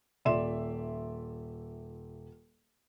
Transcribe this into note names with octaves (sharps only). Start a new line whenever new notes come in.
D#1 D5 E5 C6 E7